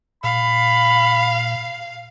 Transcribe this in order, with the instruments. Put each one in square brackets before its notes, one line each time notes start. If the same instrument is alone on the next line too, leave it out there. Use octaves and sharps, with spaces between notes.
[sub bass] A#2 [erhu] F5 [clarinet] B5